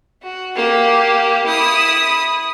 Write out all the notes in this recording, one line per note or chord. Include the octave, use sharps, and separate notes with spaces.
F#4
A#3 G4
E4 D#6